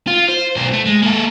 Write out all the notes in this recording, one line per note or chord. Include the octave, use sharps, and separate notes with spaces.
F4
C5
B1 C5
A3
G#3
A#3 A4